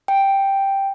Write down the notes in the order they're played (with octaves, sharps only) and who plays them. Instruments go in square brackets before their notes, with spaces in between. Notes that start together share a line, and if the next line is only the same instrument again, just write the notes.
[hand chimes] G5